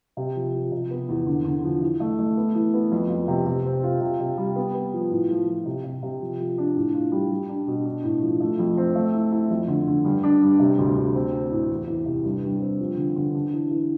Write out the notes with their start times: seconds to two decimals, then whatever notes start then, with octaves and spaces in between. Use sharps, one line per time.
0.17 C3
0.36 F3
0.54 F3
0.72 C3
0.91 B3
1.09 E2
1.26 D3
1.45 D3
1.64 F3
1.82 E3
2.00 A3
2.19 A3
2.37 B3
2.55 E3
2.74 B3
2.92 F2
3.10 F2
3.28 C3
3.46 C3
3.65 C4
3.83 F4
4.01 C3
4.20 C3
4.37 G3
4.56 B3
4.74 B3
4.93 F3
5.11 A2
5.30 F3
5.48 F3
5.65 C3
5.84 C3
6.03 C3
6.21 F3
6.40 F3
6.58 D4
6.76 A2
6.93 F4
7.12 G3
7.31 G3
7.49 D4
7.67 B2
7.85 D4
8.03 A2
8.22 F3
8.40 A3
8.59 F2
8.77 C4
8.96 A3
9.14 E4
9.32 E4
9.50 F2
9.68 D3
9.87 D3
10.04 G2
10.23 D4
10.42 G2
10.60 C3
10.79 D2
10.96 D2
11.15 C4
11.33 C4
11.51 A2
11.70 E2
11.87 E3
12.06 C3
12.24 G2
12.43 G2
12.61 C4
12.80 F3
12.97 D3
13.16 D3
13.35 D4
13.53 E3
13.71 E3